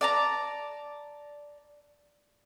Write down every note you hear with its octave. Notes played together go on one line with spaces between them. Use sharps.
D5 A5 A#5